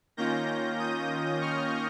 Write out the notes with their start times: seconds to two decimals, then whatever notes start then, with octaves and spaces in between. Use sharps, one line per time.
0.17 D#3 A#3 C#4 F4 G6 A#6
0.79 D#6 G6
1.41 C#6 F6